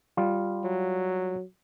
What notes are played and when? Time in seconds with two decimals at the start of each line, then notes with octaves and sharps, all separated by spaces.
0.17 G3 F4
0.64 F#3